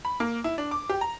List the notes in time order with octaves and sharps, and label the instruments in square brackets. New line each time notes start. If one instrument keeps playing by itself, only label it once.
[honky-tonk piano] B5
A#3
E4
D4
D6
G4
A#5